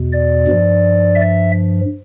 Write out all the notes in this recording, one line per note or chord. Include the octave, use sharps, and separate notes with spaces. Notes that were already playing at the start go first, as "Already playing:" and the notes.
Already playing: E2 B2
D5
G2 F3
E5